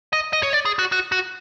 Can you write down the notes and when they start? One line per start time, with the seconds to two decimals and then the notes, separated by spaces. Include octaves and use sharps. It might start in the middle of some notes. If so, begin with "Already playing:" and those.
0.13 D#5
0.33 D#5
0.43 C#5
0.53 D5
0.65 G#4
0.79 F#4
0.92 F#4
1.12 F#4